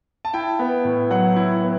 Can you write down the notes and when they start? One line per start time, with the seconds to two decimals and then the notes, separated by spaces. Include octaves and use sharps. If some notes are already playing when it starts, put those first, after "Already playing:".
0.25 A5
0.34 E4 G5
0.59 B3
0.85 A2
1.10 F#3 F#5
1.36 E4
1.62 B3